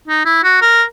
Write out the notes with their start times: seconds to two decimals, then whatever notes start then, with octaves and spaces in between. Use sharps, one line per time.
0.08 D#4
0.26 E4
0.44 F#4
0.62 A#4